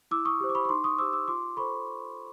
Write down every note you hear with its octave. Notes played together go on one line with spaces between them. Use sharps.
E4 D6 E6
C#6 D#6
G4 C5
D6
B5 C#6
C#6
D#4 C6 D6
C#6 D#6
G4 C5 D6 E6
D6 E6
F4 C6 D6
A4 C5 B5 C#6